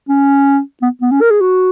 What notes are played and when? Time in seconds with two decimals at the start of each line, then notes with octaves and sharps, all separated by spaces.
0.09 C#4
0.82 B3
1.01 B3
1.11 C#4
1.21 A#4
1.30 G#4
1.41 F#4